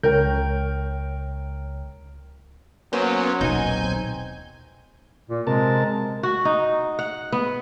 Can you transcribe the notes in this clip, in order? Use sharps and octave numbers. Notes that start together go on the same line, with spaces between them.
C#2 A#4 C#5 G5 G6
F#3 A#3 B3 C#4 C5
D#1 B1 D#4 G#5 G6
C4
A#2
C3 G#3 A#4 A5
F#4
D#4
F#5
B3